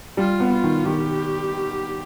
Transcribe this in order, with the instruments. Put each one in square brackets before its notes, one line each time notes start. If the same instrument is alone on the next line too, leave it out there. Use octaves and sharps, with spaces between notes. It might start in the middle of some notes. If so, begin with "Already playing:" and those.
[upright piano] G3 [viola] F4
[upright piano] B3
[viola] F4
[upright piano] D#3
[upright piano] D#3 [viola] G4